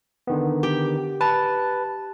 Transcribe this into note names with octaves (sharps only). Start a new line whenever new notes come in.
D3 D#3 B3
G4
B4 A5